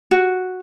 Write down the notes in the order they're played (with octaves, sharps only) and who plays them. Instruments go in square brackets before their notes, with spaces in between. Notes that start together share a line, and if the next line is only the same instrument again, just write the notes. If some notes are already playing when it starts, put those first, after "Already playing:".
[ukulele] F#4